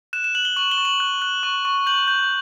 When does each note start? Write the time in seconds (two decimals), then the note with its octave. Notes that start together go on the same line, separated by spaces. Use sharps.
0.13 F#6 E7
0.24 E7
0.35 F#6 F#7
0.45 G7
0.56 C#6 F#7
0.71 G7
0.78 C#6
0.85 F#7
1.00 F#6
1.22 F#6
1.43 C#6
1.65 C#6
1.87 G6 F#7
2.08 G6